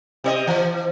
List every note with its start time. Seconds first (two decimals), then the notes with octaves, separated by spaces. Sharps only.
0.24 C3 C5 D#5
0.47 E3